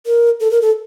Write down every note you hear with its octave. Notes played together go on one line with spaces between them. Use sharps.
A#4
A4
A#4
A4